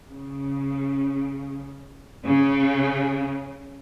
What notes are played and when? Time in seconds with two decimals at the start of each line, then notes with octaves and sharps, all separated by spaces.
0.10 C#3
2.25 C#3